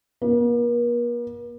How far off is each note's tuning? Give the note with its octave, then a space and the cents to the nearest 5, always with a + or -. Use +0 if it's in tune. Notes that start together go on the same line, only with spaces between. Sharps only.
A#3 +45